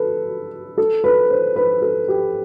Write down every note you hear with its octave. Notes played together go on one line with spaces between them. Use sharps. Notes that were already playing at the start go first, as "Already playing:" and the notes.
Already playing: A4 B4
A4
B4
C5
B4
A4
G4